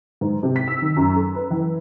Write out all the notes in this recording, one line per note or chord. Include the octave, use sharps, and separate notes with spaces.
G#2
C3
B6
E6
D#3
F#2
A4
B4
E3